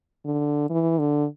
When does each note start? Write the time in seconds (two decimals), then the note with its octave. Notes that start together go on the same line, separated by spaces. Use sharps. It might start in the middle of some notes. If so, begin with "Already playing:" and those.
0.25 D3
0.70 E3
0.99 D3